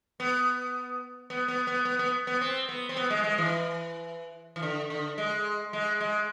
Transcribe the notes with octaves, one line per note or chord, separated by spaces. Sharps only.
B3
B3
B3
B3
B3
B3
B3
C4
B3
C4
B3
G#3
G#3
E3
E3
D3
D3
G#3
G#3
G#3